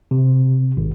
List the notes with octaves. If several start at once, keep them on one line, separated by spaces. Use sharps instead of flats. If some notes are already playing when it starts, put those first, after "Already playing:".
C3
G#1